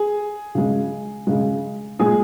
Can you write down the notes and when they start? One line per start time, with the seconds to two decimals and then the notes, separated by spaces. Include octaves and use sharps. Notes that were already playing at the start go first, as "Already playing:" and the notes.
Already playing: G#4
0.55 C#3 G#3
1.27 C#3 G#3
1.99 A#2 G#3 G#4